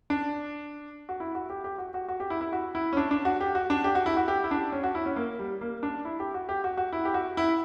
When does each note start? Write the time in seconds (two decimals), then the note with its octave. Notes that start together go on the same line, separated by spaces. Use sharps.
0.10 D4
1.09 F#4
1.20 E4
1.35 F#4
1.50 G4
1.64 G4
1.78 F#4
1.94 F#4
2.08 F#4
2.20 G4
2.30 E4
2.41 E4
2.53 F#4
2.75 E4
2.93 C#4
2.97 D4
3.11 D4
3.25 F#4
3.41 G4
3.55 F#4
3.70 D4
3.84 G4
3.95 F#4
4.06 E4
4.17 F#4
4.28 G4
4.44 E4
4.51 D4
4.72 C#4
4.83 F#4
4.95 E4
5.06 C#4
5.16 A#3
5.39 G3
5.61 A#3
5.83 D4
6.05 E4
6.20 G4
6.34 F#4
6.49 G4
6.64 F#4
6.77 F#4
6.93 E4
7.05 G4
7.14 F#4
7.37 E4